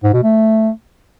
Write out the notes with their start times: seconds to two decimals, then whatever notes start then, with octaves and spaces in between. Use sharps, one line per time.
0.03 G#2
0.13 B2
0.23 A3